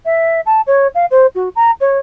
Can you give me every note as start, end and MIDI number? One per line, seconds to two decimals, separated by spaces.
0.05 0.41 76
0.46 0.61 81
0.67 0.87 73
0.95 1.06 77
1.11 1.26 72
1.35 1.49 66
1.56 1.71 82
1.81 1.98 73